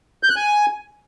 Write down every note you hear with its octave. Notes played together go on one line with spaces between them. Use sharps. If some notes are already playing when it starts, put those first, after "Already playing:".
G6
F#6
G#5